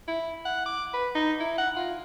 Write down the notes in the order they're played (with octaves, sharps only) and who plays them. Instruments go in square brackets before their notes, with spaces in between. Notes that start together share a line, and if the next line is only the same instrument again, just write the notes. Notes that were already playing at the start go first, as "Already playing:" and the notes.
[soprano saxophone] E4
F#5
D6
B4
D#4
E4
F#5
F4